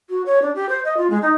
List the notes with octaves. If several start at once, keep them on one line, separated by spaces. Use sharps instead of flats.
F#4
C#5
D4
G4
C5
D#5
F4
G#3
D#4